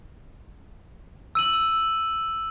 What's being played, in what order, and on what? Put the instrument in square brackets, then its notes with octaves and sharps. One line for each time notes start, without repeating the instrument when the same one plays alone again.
[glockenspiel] E6 D#7 F#7